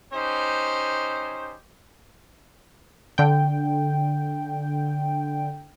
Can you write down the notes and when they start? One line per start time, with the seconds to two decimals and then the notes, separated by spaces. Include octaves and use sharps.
0.13 C#4 D#4 G4 C5
3.18 D3 G5